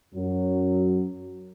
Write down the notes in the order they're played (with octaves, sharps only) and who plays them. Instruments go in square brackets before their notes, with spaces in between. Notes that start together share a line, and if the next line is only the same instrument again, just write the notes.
[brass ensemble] F#2 F#3